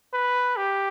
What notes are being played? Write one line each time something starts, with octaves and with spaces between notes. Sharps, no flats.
B4
G4